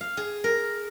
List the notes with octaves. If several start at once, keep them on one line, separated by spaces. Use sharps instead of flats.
F5
G#4
A#4